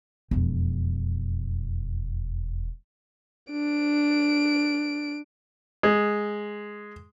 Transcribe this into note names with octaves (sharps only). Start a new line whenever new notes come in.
E1 F2
D4 D7
G#3